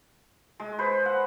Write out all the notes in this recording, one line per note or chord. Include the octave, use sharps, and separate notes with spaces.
G#3
B4 C5
F#5